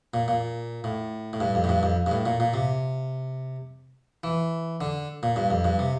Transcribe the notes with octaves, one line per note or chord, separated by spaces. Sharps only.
A#2
A#2
A2
A2
G2
F2
A2
G2
F2
G2
A2
A#2
A#2
C3
E3
D3
A#2
G2
F2
G2
C3